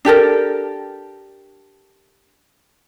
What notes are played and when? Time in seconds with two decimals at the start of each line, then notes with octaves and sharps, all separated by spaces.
0.05 D4 G4 A4 A#4